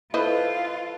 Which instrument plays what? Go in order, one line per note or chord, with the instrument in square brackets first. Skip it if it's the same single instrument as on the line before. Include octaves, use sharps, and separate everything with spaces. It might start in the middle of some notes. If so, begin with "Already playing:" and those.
[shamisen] E4 C5 D#5 [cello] F4 [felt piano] A4 B4